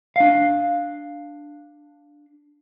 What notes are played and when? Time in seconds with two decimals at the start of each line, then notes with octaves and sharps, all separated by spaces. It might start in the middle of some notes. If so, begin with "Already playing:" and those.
0.16 D4 F5